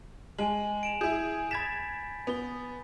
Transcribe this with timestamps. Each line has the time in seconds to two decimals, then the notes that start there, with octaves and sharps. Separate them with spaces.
0.38 G#3 G#5 A5 F#7
0.83 D7 E7 F7
1.01 E4 G#4 G6
1.51 B5 G#6 A6 B6 E7
2.27 B3 B5 G7